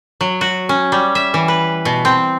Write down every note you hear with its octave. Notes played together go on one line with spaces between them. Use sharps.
F#3
F#4
C#4
G3
E5
E3
B4
B2
C4